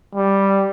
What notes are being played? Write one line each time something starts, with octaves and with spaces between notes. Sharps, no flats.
G3